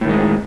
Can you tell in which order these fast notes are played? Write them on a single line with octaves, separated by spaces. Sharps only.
A2 D#3 G#3